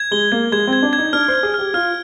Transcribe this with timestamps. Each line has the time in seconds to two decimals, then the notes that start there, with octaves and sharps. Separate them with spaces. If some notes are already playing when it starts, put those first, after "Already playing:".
Already playing: G#6
0.11 G#3 G7
0.32 A#3 G#6
0.52 G#3 G#6
0.67 C4
0.73 G#6
0.83 D4
0.93 G#6
0.98 D#4
1.13 D4 F6
1.28 C5
1.34 F6
1.43 G#4
1.54 G4 F6
1.74 F4 F6